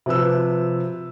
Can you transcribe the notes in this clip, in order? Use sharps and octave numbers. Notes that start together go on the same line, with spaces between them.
C3 F3 B4 E6